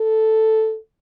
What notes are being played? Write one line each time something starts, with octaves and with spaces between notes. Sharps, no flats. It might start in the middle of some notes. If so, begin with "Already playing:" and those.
Already playing: A4